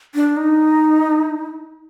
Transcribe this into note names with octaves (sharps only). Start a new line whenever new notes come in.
D4
D#4